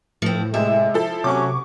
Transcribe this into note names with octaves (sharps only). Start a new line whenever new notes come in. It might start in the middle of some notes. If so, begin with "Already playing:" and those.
A2 F3 C4
C3 G#3 E5
F3 E4 A4
C3 F#3 A3 C#4 C#6 D6